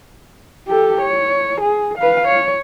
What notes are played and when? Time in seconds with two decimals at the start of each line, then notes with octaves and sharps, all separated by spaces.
0.67 G4 A4
1.02 C#5
1.61 G#4
1.99 B4 F5
2.28 C#5